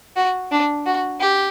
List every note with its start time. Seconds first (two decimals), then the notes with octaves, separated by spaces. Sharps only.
0.16 F#4
0.51 D4
0.86 F#4
1.20 G4